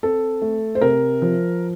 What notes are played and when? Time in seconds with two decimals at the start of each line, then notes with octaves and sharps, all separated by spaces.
0.03 C4 A4
0.42 A3
0.75 C5
0.81 C3 A#4
1.22 F3